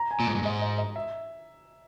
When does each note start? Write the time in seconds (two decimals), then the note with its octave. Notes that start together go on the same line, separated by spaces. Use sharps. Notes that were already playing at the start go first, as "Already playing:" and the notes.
Already playing: A#5
0.11 G#5
0.20 A#2
0.28 G#2 G#5
0.35 G2
0.43 G#2 D#5
0.62 D#5
0.78 D#5
0.96 E5